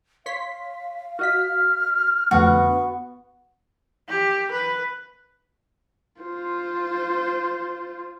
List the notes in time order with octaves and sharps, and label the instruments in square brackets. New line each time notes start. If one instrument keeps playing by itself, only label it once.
[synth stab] C#5 C6 B6 [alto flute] F5
[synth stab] F#4 D#5 B6 [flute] F6
[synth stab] F2 D3 A3 [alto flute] B3 [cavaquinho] F#4
[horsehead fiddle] G4
B4
[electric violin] F4 C5